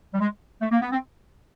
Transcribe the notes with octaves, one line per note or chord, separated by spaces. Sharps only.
G3
G#3
A3
A#3
B3
C4